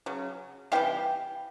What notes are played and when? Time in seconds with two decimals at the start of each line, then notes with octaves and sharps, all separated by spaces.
0.06 C#3 F#3
0.72 C3 E3 G3 F5 G5